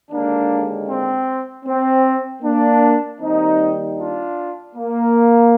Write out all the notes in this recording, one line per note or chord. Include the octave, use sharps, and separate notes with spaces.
D#2 D3 G#3 A#3 D4
C4
C4
A#3 D4
D#2 D#3 G3 C4 D#4
D4 F4
A#3